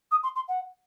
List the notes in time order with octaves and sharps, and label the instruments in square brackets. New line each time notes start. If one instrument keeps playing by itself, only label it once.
[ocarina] D#6
C6
C6
F#5